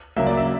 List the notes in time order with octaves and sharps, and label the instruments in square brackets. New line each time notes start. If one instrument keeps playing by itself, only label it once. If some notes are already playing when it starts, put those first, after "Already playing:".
[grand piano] C#3 F#3 A#3 E5
D5
E5